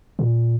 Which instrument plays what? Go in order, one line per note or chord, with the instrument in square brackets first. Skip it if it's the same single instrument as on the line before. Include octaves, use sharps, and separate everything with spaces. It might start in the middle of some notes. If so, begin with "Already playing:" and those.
[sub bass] A#2